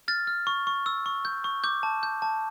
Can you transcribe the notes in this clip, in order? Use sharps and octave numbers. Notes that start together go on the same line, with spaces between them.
F6 A6
F6
C#6
C#6
E6
C#6
G6
C#6
D6 G6
A5
G6
A5